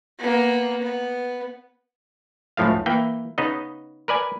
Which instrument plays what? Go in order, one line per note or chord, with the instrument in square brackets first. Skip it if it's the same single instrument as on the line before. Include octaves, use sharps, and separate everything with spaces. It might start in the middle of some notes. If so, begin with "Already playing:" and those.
[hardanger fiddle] A#3 B3
B3
[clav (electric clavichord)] C#2 F#2 A2 F3 A3 F5
E3 A#3 G5
C#3 B3 D#4 D#5
A#4 B4 D5 G#5